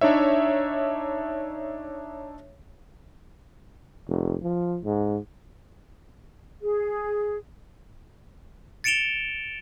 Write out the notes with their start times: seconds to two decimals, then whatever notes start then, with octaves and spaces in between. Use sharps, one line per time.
0.01 D4 D#4 C#5 E5
4.09 F1
4.42 F3
4.85 G#2
6.61 G#4
8.84 A6 C#7 D7 E7 F7 G7